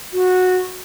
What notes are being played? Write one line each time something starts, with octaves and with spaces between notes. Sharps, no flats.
F#4